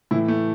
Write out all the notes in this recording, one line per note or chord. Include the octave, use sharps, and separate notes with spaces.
A2 E3 E4
A3